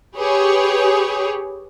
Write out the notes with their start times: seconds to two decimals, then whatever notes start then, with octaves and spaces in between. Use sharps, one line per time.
0.16 G4 G#4 B4 C#5